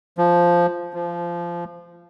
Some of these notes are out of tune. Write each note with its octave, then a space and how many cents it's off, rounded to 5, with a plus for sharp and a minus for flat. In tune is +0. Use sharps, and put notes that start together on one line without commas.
F3 -5
F3 -20